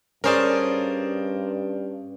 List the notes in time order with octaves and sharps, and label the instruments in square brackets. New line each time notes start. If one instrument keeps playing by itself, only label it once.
[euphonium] G2 [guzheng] C#4 G#4 A5 [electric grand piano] A#4 C5 D5